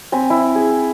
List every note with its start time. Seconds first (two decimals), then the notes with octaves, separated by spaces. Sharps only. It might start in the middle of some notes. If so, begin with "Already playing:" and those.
0.12 C4 G#5 B5
0.30 E4
0.55 G#4